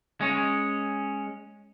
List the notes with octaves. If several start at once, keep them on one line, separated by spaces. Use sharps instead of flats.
G#3 C#4